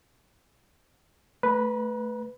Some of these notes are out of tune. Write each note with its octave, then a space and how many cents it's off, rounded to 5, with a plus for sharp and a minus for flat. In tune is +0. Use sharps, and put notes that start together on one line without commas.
A3 +0 B4 +0 A#5 +40